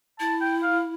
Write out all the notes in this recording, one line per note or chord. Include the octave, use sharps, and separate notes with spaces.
E4 A5
G5
F5